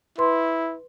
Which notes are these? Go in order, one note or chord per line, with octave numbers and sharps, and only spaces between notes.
E4 B4 C6